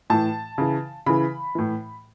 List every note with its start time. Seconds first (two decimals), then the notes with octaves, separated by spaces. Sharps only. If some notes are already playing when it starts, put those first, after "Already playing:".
0.10 A2 E3 A5
0.58 C#3 E3
1.06 C#3 E3 B5
1.55 A2 E3